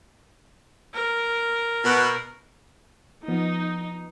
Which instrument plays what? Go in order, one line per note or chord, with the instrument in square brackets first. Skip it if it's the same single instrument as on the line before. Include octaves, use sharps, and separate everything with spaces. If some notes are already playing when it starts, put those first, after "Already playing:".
[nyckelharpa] A#4
[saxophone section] B2
[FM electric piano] F3 B3 [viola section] D#4